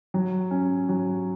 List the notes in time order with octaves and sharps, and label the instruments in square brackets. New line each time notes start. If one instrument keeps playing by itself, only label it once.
[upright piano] F#3
C#4
F#3